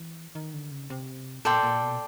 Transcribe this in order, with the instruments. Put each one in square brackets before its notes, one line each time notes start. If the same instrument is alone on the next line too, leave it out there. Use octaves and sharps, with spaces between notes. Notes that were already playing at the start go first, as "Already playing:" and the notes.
Already playing: [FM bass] E3
D#3
D3
C#3
C3
[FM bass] A#2 [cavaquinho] A4 D5 G5 C6
[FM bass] A#2
B2